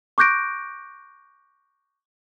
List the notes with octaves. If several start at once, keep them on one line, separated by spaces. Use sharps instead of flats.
C#6 D6 F#6 G6 A#6 D7